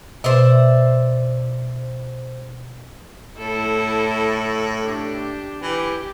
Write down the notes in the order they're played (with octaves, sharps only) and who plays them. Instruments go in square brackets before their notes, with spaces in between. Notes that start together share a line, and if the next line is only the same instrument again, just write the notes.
[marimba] B2 [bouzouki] C5 D5 E5
[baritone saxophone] A2 [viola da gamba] E4 A4
[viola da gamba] D4 G4
[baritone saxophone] E3 [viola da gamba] G4